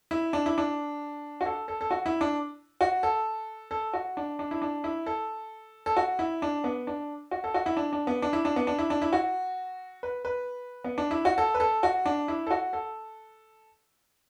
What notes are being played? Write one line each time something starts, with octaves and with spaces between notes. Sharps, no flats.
E4
D4
E4
D4
F#4
A4
A4
A4
F#4
E4
D4
F#4
A4
A4
F#4
D4
D4
E4
D4
E4
A4
A4
F#4
E4
D4
B3
D4
F#4
A4
F#4
E4
D4
D4
B3
D4
E4
D4
B3
D4
E4
D4
E4
F#4
B4
B4
B3
D4
E4
F#4
A4
B4
A4
F#4
D4
E4
A4
F#4
A4